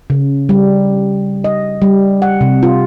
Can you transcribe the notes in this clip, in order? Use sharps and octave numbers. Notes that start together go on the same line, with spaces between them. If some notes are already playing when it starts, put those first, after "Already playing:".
C#3
G3
D#5
G3
F#5
C3
F4